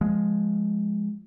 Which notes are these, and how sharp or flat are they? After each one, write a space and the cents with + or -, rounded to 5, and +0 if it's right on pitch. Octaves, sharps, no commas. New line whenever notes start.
F3 +0 G#3 +0